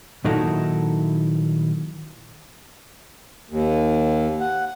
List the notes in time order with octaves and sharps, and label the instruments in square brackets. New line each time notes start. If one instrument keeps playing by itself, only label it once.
[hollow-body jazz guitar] A#2 D#3 F#3 D#4 E4 A4
[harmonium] D#2
F#5